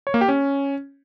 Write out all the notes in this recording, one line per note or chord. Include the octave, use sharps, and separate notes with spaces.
C#5
A#3
G4
C#4